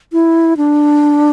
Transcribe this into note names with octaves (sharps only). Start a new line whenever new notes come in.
E4
D4